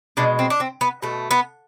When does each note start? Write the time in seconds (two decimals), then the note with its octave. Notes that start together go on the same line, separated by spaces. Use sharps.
0.17 B2 G#3 D4
0.39 C4
0.50 D4
0.60 C4
0.81 B3
1.02 B2 A3
1.31 B3